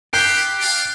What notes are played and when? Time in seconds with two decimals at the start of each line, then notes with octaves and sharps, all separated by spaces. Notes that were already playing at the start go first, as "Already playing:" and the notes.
0.13 D#4 F4 G4 B5 F#6 G6 C7 G7
0.60 D4 F5